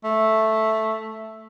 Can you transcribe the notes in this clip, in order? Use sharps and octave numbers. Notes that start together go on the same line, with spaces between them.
A3